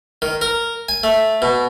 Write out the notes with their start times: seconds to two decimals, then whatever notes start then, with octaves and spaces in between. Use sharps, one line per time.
0.22 D#3
0.41 A#4
0.89 G#5
1.03 A3
1.42 B2